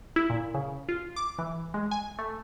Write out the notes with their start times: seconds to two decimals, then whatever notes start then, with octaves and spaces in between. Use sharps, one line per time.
0.16 E4
0.30 A#2
0.54 C#3
0.89 F4
1.16 D6
1.39 E3
1.74 G#3
1.91 G#5
2.19 A3